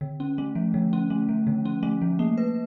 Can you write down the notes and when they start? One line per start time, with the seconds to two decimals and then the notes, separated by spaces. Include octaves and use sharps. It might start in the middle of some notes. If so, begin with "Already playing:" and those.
0.01 D3
0.20 C#4
0.38 A3
0.55 F3
0.74 D3
0.93 C#4
1.10 A3
1.29 F3
1.47 D3
1.65 C#4
1.83 A3
2.01 F3
2.19 A#3
2.38 B4